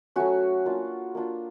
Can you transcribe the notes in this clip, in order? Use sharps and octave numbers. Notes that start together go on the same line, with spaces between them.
F#3 A3 C#4 F#4
A#3 D4 F4
A#3 D4 F4